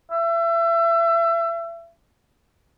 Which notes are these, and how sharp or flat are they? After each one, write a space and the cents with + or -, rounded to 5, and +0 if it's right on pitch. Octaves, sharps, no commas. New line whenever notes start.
E5 +30